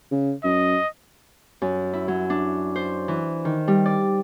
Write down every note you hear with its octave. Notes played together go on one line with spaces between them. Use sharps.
C#3
F#2 D#5
F#2
E4
F#3
D4
C5
E3
D#3
G3
D5